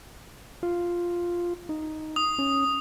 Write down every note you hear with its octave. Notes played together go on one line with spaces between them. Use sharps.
F4
D#4
D#6
C#4